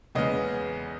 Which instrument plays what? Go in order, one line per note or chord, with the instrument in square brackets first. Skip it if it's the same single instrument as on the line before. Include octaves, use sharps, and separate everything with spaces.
[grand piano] E2 C#3 G#3 B3 D#5